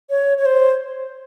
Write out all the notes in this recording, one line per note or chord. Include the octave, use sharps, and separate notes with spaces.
C#5
C#5
C5